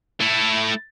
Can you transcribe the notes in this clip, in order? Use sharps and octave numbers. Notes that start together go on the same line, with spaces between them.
A3 E4